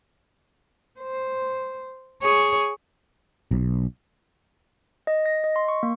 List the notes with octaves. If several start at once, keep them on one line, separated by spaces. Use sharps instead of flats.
C5
G#4 C#5
B1
D#5
A#6
D#5
C6
C#6
A#3